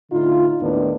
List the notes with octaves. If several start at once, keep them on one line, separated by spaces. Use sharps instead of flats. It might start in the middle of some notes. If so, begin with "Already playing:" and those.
A2 D3 D#4 F4
D#2 A2 D#3 B3 D4